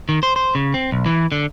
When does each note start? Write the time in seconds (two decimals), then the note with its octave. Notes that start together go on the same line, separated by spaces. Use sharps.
0.09 D#3
0.23 C5
0.36 C5
0.55 C#3
0.74 C4
0.92 B1
1.06 E3
1.32 D3